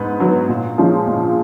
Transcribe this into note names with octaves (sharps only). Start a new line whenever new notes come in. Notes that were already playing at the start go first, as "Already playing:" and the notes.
Already playing: G#2 B3
F#3 B3
A#2
F3 G#3 C#4
A#2